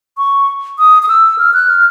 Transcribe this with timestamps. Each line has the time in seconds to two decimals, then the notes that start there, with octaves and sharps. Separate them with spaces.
0.18 C#6
0.79 D#6
1.03 D#6
1.09 E6
1.38 F6
1.54 F#6
1.70 F6